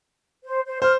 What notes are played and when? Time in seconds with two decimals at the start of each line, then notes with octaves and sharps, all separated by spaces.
0.44 C5
0.66 C5
0.82 C5 F6